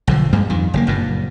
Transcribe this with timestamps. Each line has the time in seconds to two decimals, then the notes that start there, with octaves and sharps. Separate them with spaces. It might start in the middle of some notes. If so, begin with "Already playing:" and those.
0.07 B1 D3 F3
0.33 G2 G3 G#3
0.50 F2 D#3
0.74 F#1 C#3 A#3
0.87 F#1 G2 A#2